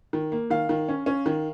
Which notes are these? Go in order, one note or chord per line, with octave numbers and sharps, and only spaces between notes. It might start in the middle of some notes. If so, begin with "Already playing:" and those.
D#3
A#3
D#3 F5
D#3
C#4
C#4
D#3